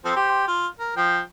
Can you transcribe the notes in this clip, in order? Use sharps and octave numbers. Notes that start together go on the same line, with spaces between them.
F3 C4 A4
G4 C5
F4
A#4
F3 G5